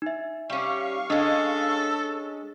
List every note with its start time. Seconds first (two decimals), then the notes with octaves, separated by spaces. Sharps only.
0.02 D#4 E5
0.50 G3 C#4 F5 C#6
1.10 G#3 C#4 D4 A4